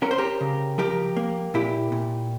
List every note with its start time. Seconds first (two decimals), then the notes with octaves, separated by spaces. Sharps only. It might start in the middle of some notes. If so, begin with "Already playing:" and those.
0.02 C#4 A#4
0.11 C5
0.18 G4 A#4
0.41 C#3
0.78 F3 G4 A#4
1.17 A#3
1.54 A#2 E4 G4
1.92 A#2